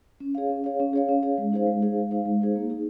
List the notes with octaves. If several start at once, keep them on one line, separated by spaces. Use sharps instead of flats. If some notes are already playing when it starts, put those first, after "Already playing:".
C#4
G#4 C#5 F5
C#4
G#4 C#5 F5
C#4
G#4 C#5 F5
C#4
G#4 C#5 F5
G#3
D#4 G#4 C5 F5
G#3
D#4 G#4 C5 F5
G#3
D#4 G#4 C5 F5
G#3
D#4 G#4 C5 F5
A#3
D#4 G#4